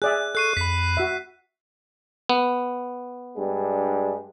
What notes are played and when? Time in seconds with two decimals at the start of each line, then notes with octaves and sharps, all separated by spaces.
0.02 G#4 D5 E5 F#6
0.35 A4 C#6 F#6 C7 D#7
0.57 F2 B5 B6
0.97 F#4 E5
2.29 B3
3.36 G2 G#3 D4